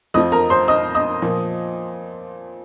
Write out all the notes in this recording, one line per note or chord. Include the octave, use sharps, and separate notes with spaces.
F2 F3 D#5 D#6
A#4 A#5
C5 C6
D#5 D#6
D#5 D#6
A#2 F3